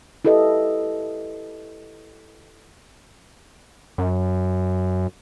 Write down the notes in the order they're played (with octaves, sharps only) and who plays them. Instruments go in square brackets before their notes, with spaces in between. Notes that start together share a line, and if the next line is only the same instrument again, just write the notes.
[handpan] E4 G4 A4 B4 D#5
[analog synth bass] F#2